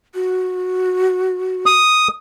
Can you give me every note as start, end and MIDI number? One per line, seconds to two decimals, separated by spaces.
0.15 1.71 66
1.66 2.08 87